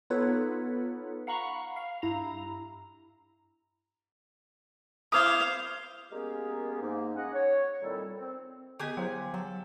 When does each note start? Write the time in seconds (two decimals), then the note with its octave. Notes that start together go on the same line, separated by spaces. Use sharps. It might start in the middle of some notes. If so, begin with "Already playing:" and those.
0.10 B3 D#4 F4 A4 B4 C#5
1.27 F5 F#5 A#5 B5 C#6
1.76 F5
2.02 G2 E4 A#5
5.12 E4 C5 F5 D6 D#6
6.12 G#3 A#3 B3 C#4 G4 G#4
6.82 G#2 A#3 D#4
7.16 G#3 C#4 D#5 F#5
7.34 C#5
7.82 A#2 D#3 G3 C4 E4 A4
8.17 C4
8.80 D3 B3 G4 G#4 D#5 G#5
8.97 F#3 E4 C5 F5 G5
9.34 F#3 A4